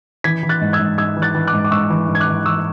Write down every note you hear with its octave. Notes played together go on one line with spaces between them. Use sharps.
E3 G#6 B6
E3
F#6 A6
G#2
E6 G#6
G#2
G#2 E6 G#6
E3
F#6 A6
E3
D6 F#6
G#2
D6
G#2 C#6 E6
E3
G#2
G#6
D6 F#6
E3
E3 C#6 E6